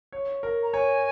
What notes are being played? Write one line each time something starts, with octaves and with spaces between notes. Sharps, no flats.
C#5
A#4
A#5
C#5 G#5